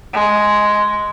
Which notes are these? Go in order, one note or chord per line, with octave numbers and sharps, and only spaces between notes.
G#3